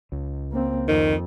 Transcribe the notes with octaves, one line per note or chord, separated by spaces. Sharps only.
C#2
A#3 C4
F2 D#3